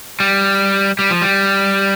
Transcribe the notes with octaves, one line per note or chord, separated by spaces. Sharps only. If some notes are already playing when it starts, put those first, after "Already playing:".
G3
G3
F3
G3